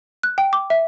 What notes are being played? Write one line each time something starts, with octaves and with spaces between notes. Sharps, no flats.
F#6
G5
D6
E5